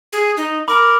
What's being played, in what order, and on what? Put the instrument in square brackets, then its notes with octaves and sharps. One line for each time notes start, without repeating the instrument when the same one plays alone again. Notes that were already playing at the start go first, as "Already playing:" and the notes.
[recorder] G#4
D#4
[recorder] A#4 [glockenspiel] B5 D6